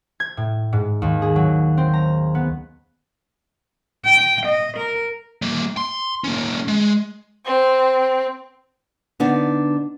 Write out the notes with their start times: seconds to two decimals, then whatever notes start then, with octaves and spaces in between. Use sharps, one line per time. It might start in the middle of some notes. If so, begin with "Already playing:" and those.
0.20 G#6
0.37 A2
0.73 G#2
1.02 D#2
1.22 G#4
1.36 F#3
1.77 C4
1.93 A#5
2.35 B3
4.05 G5
4.46 D#5
4.77 A#4
5.42 G3 A#3
5.77 C6
6.24 A#3 C#4
6.68 G#3
7.46 C4
9.20 D3 B3 D4 D#4